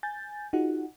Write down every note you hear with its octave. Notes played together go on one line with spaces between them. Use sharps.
G#5 G6 A6
D#4 F4 F#4 G#4 F#5